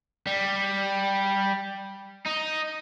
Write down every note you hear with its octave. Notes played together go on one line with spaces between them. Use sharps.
G3
D#4